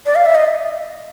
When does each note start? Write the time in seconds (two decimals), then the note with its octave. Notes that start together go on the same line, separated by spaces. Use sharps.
0.06 D5
0.15 F5
0.26 E5
0.35 D#5